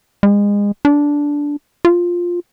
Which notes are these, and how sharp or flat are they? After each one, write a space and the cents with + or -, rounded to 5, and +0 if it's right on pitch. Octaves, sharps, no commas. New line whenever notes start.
G#3 -30
D4 -10
F4 +5